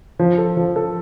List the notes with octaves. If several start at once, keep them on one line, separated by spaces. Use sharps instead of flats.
F3
A4
F3
A4